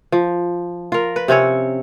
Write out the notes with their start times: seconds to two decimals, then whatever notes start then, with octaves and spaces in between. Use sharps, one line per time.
0.12 F3
0.92 F4 A#4
1.16 B4
1.28 C3 C4 C#4 C#5